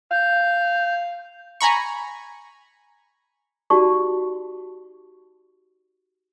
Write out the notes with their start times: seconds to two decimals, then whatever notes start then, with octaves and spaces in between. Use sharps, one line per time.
0.11 F5 G6
1.61 G#5 A#5 B5 C#6
3.70 D#4 F#4 G4 D5 A5 C#6